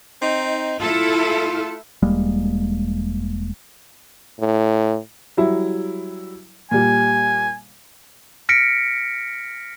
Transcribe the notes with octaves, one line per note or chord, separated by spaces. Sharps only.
C4 D#4
A3 E4 F4 A4
E1 G3 G#3 A#3
A2
F#3 G3 E4
A#2 G3 G#5
F6 A#6 B6 C#7 D7